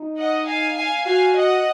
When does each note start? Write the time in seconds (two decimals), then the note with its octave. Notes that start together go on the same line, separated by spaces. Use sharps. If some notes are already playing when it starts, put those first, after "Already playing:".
Already playing: D#4
0.17 D#5 F#5
0.47 F5 G#5
0.77 F5 G#5
1.06 F#4 F5 G#5
1.36 D#5 F#5